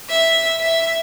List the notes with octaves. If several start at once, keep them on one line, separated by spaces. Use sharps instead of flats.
E5
E5